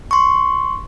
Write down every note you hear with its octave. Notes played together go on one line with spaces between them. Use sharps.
C6 C#6